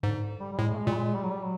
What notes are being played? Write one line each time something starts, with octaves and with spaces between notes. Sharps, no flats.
G#2 D3
G3
G3
A2 G#3
A3
G#3
A#2
G3
G#3
G3
F#3
G3
F#3